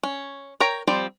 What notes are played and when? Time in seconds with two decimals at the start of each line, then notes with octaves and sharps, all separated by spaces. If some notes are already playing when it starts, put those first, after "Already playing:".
0.03 C#4
0.60 A#4 C#5 G5 A#5
0.87 F3 G3 C4 C5